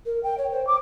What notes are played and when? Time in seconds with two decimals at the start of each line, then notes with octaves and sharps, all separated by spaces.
0.06 A#4
0.23 G5
0.38 C#5
0.52 C5
0.67 D6